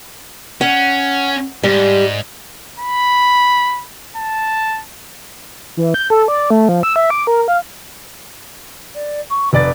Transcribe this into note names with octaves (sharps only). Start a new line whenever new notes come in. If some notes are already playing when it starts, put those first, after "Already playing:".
C#4 F#5
G#2 G3
B5
A5
E3
G6
A4
D5
A3
F3
E6
E5
D6
A#4
F5
D5
C#6
F1 B4 D5 A6